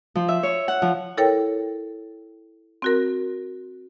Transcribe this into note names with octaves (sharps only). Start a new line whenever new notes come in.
F3
E5
C#5
F#5
F3
E4 A4 A#4 C#5 G5
C4 F#4 A#4